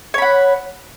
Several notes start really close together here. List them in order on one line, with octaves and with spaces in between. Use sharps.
C#5 B5 F#5